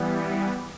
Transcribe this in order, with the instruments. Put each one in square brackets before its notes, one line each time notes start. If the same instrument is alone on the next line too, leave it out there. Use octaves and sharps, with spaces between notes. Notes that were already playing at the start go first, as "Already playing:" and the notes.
Already playing: [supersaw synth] E3 G3 B3